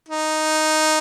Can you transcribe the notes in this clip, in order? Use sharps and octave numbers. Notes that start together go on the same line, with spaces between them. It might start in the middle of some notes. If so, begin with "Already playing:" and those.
D#4